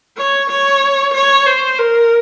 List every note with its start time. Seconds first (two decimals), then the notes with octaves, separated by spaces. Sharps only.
0.18 C#5
0.50 C#5
1.14 C#5
1.46 C5
1.79 A#4